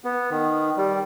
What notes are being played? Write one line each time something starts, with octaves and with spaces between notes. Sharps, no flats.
B3
D#3
G3